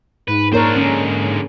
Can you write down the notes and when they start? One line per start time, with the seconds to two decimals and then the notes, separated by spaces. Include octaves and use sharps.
0.28 G#2 B4
0.52 A#3 D4 A#4 C5 C#5
0.76 D3 G#3 C#4